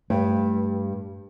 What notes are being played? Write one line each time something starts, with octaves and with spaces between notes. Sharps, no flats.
G2 A3